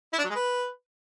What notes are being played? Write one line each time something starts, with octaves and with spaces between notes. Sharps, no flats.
E4
D4
F#3
G#3
B4